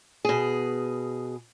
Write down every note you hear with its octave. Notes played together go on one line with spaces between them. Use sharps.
B2 G#4